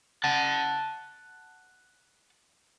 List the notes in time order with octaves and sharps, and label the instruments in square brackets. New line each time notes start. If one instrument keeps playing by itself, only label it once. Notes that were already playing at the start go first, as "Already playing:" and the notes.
[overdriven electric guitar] F#5 A5